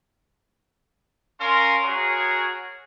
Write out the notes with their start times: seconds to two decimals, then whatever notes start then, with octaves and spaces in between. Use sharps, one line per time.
1.39 C#4 A#4 F5 C6
1.84 F#4 G#4 A#4 C#5